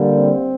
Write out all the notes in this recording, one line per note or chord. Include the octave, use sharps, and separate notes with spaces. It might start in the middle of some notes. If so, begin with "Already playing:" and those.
Already playing: D3 G3 A#3
C4